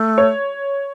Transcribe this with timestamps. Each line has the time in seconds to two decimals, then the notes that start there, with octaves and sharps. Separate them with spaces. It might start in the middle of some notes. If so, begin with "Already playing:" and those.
Already playing: A3
0.18 C#5